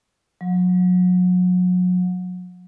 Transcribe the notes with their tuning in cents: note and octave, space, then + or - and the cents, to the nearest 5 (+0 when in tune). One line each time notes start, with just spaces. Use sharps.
F#3 -35